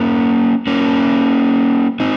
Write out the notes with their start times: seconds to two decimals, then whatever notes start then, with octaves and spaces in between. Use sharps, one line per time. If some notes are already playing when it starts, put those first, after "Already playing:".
Already playing: A#3 C#4
0.67 A#3 C#4
2.00 C4 D#4